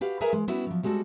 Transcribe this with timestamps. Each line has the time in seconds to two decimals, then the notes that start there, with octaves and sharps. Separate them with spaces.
0.01 F#4 G4 B4 F5
0.21 G#4 A#4 B4 E5 G#5 A#5
0.33 E3 G#3
0.48 G3 B3 C#4 E4 F#4 B4
0.67 F3 F#3
0.83 G3 G#3 C4 F#4 A4